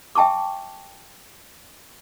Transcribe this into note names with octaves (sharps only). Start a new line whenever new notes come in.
E5 G5 A5 C#6 D6